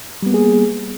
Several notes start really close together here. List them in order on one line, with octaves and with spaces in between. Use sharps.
G3 B3 A#3 G#4